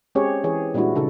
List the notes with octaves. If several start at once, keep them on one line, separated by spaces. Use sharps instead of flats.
G#3 C4 C#4 G4 G#4 C#5
E3 G#4 C#5
A#2 G3 G#3 D4 E4 F#4
C#3 D#4 A4